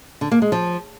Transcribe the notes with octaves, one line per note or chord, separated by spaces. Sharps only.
D3
A#3
G#3
F3